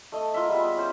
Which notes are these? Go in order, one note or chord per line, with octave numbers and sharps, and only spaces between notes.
A3 D#5
A#3 F4 D#5 E5
G3 G#3 B3
C#4 G#4 C5